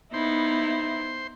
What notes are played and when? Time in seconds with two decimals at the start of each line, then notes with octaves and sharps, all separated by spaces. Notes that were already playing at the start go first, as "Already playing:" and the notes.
0.14 B3 D#4 E4 C5 C6